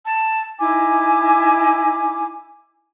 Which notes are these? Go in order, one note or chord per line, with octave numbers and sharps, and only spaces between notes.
A5
D#4 E4 G#5 D6